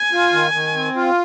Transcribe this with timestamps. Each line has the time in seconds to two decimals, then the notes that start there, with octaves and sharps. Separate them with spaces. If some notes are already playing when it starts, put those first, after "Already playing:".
Already playing: G#5
0.12 F4
0.32 D#3
0.53 D#3
0.75 C4
0.95 F4